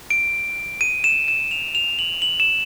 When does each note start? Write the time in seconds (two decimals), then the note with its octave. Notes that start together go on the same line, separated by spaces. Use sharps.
0.10 D7
0.81 D#7
1.04 E7
1.28 E7
1.51 F7
1.75 F7
1.99 F#7
2.22 F#7
2.40 E7